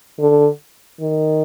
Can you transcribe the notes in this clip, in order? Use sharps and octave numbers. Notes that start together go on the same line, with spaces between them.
D3
D#3